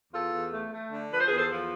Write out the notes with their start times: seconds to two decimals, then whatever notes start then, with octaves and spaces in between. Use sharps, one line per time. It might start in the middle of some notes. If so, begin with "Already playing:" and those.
0.12 E2 F4 A4
0.31 E2
0.51 A3
0.71 A3
0.90 D3
1.10 F3 B4
1.19 C5
1.27 G#4 B4
1.30 E2
1.36 A4 C5
1.50 F3